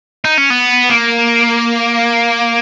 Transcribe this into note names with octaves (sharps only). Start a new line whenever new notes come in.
D#4
C#4
B3
A#3